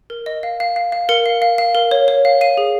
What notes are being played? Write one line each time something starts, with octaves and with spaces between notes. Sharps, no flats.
A#4
D#5
F5
F5
F5
F5
A#4 C#7
F5
F5
F5
A#4
C#5
C#5
F5
F5 D#7
G#4